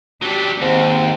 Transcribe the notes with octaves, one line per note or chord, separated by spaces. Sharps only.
F#3 G3 D4
D#2 G#2 C4